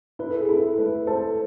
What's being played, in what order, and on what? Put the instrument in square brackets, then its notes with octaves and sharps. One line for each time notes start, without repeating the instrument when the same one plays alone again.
[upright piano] E4 [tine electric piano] B4
[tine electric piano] A4
G#4
[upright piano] E4 [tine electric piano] A4
[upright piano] A3 [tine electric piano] B4
[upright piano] A4 [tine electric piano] C5